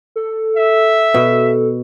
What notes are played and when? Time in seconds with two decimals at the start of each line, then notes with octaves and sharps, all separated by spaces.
0.16 A4
0.57 E5
1.14 B2